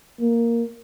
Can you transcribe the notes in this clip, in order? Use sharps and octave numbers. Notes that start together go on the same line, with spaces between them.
A#3